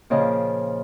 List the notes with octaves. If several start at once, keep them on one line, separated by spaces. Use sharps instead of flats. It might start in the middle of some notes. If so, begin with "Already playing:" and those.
A#2 C#3 F3 D#5